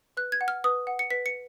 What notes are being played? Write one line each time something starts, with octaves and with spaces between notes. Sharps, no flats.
B4 F#6
G#6
F#5
F6
B4 D#6
F#5
C#7
B4 B6
C#7